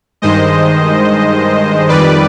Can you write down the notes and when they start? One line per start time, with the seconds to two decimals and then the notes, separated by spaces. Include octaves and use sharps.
0.22 G2 D#3 G#3 C5 D#5
1.88 F2 D#3 G3 B4 D5